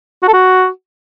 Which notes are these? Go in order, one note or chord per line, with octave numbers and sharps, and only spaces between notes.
F#4
A4
F#4